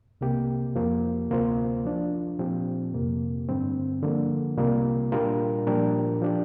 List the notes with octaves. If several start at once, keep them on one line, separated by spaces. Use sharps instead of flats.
C2 C3 A#3 G4
F2 F3 A#3
D2 C3 A#3 F4 C5
F3 D4 F4
A#2 F3 C4 G4
F2 C3 A#3
G2 D3 G3 C4
D3 F3 A#3
C2 C3 G3 A#3 F4
A#2 G3 D4 F4 A#4
A#2 F3 D4 G4 A#4
F3 D4 G4